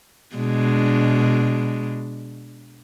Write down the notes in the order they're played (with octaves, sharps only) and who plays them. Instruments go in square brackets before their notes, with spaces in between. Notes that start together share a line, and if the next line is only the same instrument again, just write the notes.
[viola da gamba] B2 G#3 D4